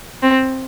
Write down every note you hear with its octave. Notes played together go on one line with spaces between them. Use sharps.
C4